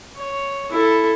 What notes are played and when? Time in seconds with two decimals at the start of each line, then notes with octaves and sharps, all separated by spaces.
0.16 C#5
0.70 E4 A4